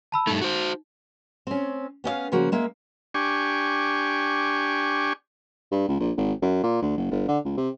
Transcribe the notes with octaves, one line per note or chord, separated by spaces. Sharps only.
A5 B5 E6
G2 A3 D#4
F#4 C5
C4 C#4
B3 C#4 D5 F5
C#3 F3 A#3 F#4
G#3 A#3 E5
D4 G4 G#5 C#6
G2
C#2
A#1
G#1
F#2
A#2
D2
F#1
G1
D3
C#2
C3